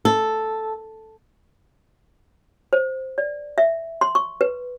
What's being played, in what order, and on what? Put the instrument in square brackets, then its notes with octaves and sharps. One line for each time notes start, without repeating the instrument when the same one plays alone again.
[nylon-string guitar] A4
[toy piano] C5
D5
E5
C6
C#6
B4